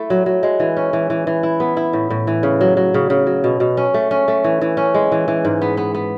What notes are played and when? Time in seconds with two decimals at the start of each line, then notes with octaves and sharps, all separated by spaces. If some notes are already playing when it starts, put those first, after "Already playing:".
Already playing: A3 E4 A4
0.10 F#3
0.26 F#3
0.43 G#3
0.60 E3
0.77 C#4
0.93 E3
1.10 E3
1.27 E3
1.43 E4
1.60 B3
1.77 E4
1.93 A2
2.10 A2
2.27 E3
2.43 C#3
2.61 F#3
2.77 F#3
2.94 C#3
3.10 C#3
3.27 F#3
3.44 B2
3.60 B2
3.77 C#4
3.94 A3
4.11 C#4
4.28 A3
4.44 E3
4.61 E3
4.77 C#4
4.94 G#3
5.12 E3
5.28 E3
5.45 G#2
5.62 B3
5.77 B3
5.95 B3